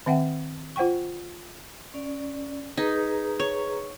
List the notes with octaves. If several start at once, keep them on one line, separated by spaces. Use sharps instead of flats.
D#3 C4 E5 F#5 G5
F4 C5 F#5 G5 C#6
C#4 D5
D#4 G#4 B4 A#5
C#5